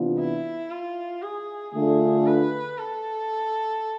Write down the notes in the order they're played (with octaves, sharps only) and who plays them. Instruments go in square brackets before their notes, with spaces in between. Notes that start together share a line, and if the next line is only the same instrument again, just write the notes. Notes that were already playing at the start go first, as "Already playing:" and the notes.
Already playing: [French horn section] C3 E3 B3 D4 F4
[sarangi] E4
F4
G#4
[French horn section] D3 A3 D4 F4 [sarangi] G#4
[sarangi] B4
A4